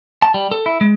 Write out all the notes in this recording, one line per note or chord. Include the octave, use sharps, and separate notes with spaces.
A5
G3
A4
E4
G#3